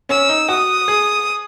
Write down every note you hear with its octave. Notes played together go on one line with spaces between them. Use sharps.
C#4 E6
D#4
F#4 D#6
G#4